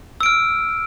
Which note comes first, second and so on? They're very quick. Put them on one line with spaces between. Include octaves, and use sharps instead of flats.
E6 D7 F6